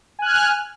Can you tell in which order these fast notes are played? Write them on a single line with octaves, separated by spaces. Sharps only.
G#5 F#6 F6